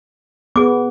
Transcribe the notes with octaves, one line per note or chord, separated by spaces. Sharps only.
B3 G#4 D6